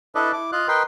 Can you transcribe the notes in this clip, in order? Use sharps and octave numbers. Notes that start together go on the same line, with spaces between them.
D4 E4 A4 B4 D5 D#5
E4 D6
F4 D#5 F5 F#6
A#4 B4 D#5 G5 C6